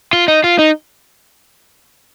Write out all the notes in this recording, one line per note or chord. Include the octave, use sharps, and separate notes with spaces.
F4
D#4
F4
D#4